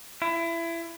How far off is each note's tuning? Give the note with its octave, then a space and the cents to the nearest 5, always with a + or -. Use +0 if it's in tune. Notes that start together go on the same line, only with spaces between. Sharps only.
E4 +25